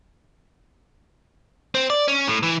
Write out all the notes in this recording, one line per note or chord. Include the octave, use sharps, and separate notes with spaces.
C4
D5
C#4
A2
E3